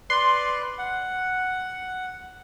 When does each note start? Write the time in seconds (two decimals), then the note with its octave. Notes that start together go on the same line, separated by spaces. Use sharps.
0.10 B4 D5 C6
0.78 F#5